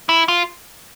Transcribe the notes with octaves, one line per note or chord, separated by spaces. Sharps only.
E4
F4